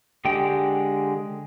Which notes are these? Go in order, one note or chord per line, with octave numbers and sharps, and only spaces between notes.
D3 G#3 G4 G5